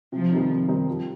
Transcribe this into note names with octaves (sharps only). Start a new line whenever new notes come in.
C3 F3
D#3 G3 C4 D#4
C3
D#3 G3 C4 D#4
F3